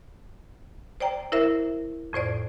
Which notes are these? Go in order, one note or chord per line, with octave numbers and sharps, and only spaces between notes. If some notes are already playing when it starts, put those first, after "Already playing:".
C5 D5 G5 A#5
E4 A#4 C5 E5
F2 A2 C5 D5